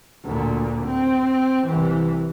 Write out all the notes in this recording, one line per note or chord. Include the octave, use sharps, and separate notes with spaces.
D2 A#2
C4
C2 E3